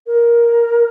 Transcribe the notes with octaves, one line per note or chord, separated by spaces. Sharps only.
A#4